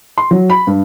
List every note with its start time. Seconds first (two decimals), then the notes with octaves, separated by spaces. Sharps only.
0.18 C6
0.31 F#3
0.50 B5
0.67 G2